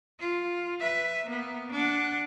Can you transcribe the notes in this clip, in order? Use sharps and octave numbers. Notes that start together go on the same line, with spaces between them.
F4
B4 E5
A#3 B3
D4 F#5